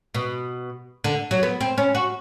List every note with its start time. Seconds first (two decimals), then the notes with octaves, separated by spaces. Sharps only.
0.14 B2
1.04 D3
1.31 F#3
1.43 B3
1.61 C4
1.78 C#4
1.95 F#4